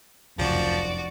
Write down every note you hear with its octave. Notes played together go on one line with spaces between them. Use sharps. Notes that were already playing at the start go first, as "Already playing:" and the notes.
F1 C#2 F#2 C#3 F3 F#4 D5